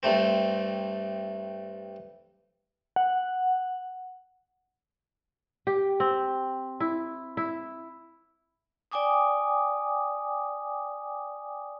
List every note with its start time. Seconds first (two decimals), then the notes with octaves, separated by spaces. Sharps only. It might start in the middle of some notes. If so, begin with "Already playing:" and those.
0.03 G2 G3 A3 C4
2.96 F#5
5.67 G4
6.00 C4
6.80 E4
7.37 E4
8.91 D5 G5 G#5 D6 D#6